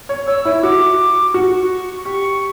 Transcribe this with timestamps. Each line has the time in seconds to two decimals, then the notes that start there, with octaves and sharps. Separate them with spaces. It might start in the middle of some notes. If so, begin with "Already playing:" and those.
0.09 C#5
0.27 C#5 E6
0.45 E4
0.63 F#4 D6
1.34 F#4 C#6
2.05 G4 C#6